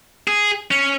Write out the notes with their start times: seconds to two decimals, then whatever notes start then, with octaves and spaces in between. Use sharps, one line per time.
0.28 G#4
0.71 C#4